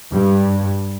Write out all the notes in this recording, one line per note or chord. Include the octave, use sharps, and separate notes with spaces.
G2